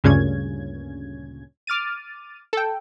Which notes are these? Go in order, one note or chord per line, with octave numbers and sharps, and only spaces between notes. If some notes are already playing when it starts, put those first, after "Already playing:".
D2 G2 A#2 C#3 C#4 G#6
D6 F6 A6 D#7
A4 G5